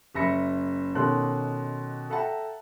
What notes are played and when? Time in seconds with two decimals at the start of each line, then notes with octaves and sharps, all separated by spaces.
0.15 F#1 E5 B5 A#6 C#7
0.95 B2 D#3 C#4 A4 C6 F#6
2.09 A4 E5 F#5 G5 A5 A#5